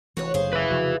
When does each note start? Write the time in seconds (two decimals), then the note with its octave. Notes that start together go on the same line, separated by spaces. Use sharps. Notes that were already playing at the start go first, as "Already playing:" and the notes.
0.17 F1 E3 F#4 B4 C#5
0.34 F#1 F#2 G#4 C5 F5
0.53 A1 B4 E5
0.70 F1 C#3 F3 F#4